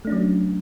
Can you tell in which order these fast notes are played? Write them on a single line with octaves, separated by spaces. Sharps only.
A3 D4 C#4 F#3